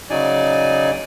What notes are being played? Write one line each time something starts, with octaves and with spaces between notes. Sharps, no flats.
C#3 F#3 D#4 D5 G#5